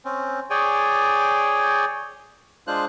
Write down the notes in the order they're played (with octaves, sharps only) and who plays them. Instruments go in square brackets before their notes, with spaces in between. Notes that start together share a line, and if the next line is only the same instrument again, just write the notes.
[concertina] C4 C#4
G#4 C#5 D5 G5 G#5
G#3 D4 F4 C5 F#6